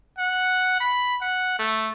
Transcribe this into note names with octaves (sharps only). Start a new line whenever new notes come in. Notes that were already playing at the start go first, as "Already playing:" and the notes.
F#5
B5
F#5
A3